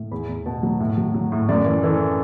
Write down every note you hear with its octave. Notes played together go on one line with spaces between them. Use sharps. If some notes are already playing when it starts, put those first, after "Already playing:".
Already playing: A2
E2 B5
E2
B2 A5
F#3
A2
F#3
F#3
A2
F#2 D5
E3
E3 A4